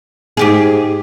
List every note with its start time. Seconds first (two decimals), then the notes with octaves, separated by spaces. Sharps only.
0.37 G#2 G4 G#4